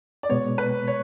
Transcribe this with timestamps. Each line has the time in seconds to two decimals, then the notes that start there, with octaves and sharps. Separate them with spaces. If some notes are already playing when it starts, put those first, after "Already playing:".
0.23 D5
0.30 B2 G#3 B3 C#5
0.58 B4
0.88 C#5